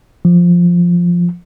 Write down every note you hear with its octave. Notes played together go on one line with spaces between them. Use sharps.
F3